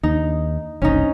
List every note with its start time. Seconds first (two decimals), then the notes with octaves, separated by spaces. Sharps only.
0.03 D#2 D#4
0.82 F#1 C2 C#4 D#4